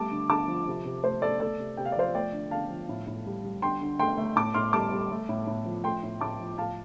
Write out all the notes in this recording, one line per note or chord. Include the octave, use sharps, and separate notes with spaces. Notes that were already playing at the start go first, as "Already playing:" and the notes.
Already playing: G3 A3 A5 D6
D3
D3 A5 D6
F3
C3
C3
A3 C5
A3 A4 D5
A3 A4 D5
C3
C3 G5
F5
D5
F3 C5 F5
A3 D5 G5
D3
D3 F5 A5
F3
A2
A2
G3
G3
D3 G5 C6
D3
A3 G5 C6
A3
A2 A5 D6
A2 C6 F6
G3 A5 D6
G3
A3
A2
A2
F3
A3 G5 C6
A2
A2 A5 D6
F3
A2 F5 A5